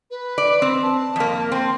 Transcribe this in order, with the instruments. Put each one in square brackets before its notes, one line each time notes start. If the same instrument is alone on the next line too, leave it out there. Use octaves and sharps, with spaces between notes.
[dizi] B4
[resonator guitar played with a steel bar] D5
C4
[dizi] A5
[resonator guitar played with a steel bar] F2 A#3
[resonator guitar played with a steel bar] C4 [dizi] C6